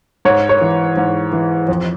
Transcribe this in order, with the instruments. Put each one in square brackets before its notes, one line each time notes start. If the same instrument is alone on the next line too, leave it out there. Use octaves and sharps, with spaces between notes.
[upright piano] G#2 C#5
C#5
E3
G#2
E3
F2